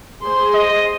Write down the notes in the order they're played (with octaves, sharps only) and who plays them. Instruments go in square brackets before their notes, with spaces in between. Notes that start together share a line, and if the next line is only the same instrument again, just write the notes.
[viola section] G#4 C5 C6
[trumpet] D#5